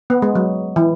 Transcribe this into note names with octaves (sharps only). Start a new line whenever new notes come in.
B3
G#3
F#3
E3